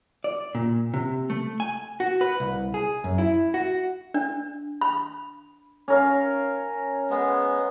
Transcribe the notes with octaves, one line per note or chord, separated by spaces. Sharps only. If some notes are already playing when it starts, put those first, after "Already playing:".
D5
A#2
C3
A3
G#5
F#4
B4
C2
G#4
F#2
E4
F#4
D4
B5
C#4 A#4 F5
G#3 B3